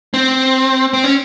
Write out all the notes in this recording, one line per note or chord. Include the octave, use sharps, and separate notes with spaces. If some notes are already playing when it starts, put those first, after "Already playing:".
C4
C4
C#4